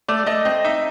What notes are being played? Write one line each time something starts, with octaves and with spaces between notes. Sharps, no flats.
A3 D5
A3 D#5
C4 D#5
D#4 E5